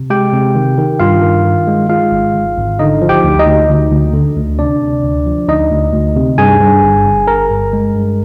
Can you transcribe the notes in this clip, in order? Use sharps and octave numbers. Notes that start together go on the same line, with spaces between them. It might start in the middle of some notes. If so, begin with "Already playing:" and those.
Already playing: C3
G#3 G4 G5
C3
D#3
D#3
G2 F4 F5
D#3
D#3
G#3
G#3 F4 F5
G#1
D#3
G#1
D3 D#4 D#5
F3
G4 G5
D2
D#4 D#5
D2
D2
D2
D3
D2
C3 D4 D5
C3
D2
F3
D2 D#4 D#5
D2
D2
C3
G2 G#4 G#5
G2
G1
G1
G1 A#4 A#5
G2
G#3
G2